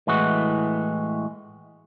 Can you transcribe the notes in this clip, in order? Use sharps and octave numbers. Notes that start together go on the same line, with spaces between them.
A2 E3 G#3 F#4